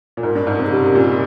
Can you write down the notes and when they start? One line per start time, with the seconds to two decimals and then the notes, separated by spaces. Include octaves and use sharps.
0.17 A#2
0.23 G#2 A#4
0.35 G2
0.47 G#2
0.59 C3
0.66 G#4
0.71 C#3 G4
0.95 A#2